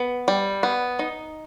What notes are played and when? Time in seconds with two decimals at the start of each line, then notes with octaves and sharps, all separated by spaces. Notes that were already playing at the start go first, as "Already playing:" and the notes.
Already playing: B3
0.28 G3
0.63 B3
0.99 D#4